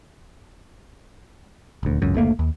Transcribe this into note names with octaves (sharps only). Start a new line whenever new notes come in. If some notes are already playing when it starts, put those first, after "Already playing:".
D#1 D2
G#1 C#2 F#2
F#1 D2 A3 A#3
D#2